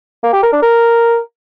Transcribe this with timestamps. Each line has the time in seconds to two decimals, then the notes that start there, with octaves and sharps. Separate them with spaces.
0.23 A#3
0.33 G4
0.43 A#4
0.52 D4
0.62 A#4